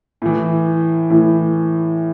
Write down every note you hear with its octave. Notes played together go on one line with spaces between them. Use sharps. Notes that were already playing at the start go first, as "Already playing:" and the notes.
A2 E3
A2 E3